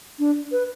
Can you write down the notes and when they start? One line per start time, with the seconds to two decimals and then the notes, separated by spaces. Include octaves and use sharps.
0.19 D4
0.52 B4